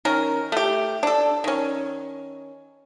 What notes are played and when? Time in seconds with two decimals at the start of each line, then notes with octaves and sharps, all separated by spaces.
0.05 D#3 C#4 A#4
0.52 A3 G4
1.03 D4 A4
1.44 D#3 C#4